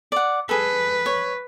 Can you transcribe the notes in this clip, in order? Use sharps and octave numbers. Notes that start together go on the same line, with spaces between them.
D5 F#5
G#4 A4 B4
C#5